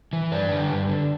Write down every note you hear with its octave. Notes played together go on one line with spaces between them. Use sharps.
E3
G2 B4 D5
D3
G2
D3